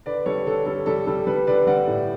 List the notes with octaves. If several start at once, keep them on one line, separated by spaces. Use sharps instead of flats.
D3 B4 D5
G3 A4 C#5
D3 A4
G3 A4
G3 A4
G3 A4
G3 B4
D3 B4 D5
G3 D5 F#5
A2